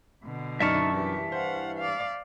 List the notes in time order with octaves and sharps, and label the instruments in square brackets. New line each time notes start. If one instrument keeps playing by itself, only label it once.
[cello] B2 D3
[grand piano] F#2 D4 F6 [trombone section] D#4 [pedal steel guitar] E5 A5 C#6
[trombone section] G2 E3 [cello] G4
[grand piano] C5 [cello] F5 F#5
[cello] D5 F5